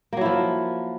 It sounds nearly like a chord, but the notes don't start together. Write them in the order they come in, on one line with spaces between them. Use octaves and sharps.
A#3 F#3 E4 F3